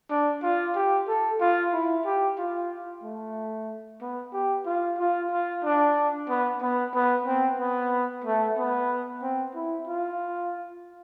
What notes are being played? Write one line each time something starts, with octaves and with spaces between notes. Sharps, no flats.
D4
F4
G4
A4
F4
E4
G4
F4
A3
B3
G4
F4
F4
F4
D4
B3
B3
B3
C4
B3
A3
B3
C4
E4
F4